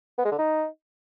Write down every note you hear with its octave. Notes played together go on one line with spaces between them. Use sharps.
B3
G#3
D3
D#4